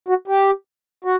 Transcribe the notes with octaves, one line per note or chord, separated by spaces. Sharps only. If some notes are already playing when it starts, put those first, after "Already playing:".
F#4
G4
F#4